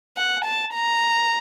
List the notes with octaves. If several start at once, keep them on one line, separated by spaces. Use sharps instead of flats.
F#5
A5
A#5